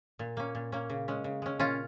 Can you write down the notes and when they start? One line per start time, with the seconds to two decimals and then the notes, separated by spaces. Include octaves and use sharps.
0.19 A#2
0.37 A#3 C#4
0.55 A#2
0.72 A#3 C#4
0.90 C#3
1.08 G#3 C#4
1.24 C#3
1.42 G#3 C#4
1.60 A#2 C#4 F4